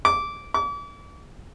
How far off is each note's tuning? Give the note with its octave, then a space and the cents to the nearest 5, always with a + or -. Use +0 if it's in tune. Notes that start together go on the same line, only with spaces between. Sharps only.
D6 -15
D6 -40